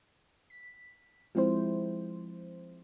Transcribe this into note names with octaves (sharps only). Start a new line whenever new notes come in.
B6
F3 G#3 C4 E4 C5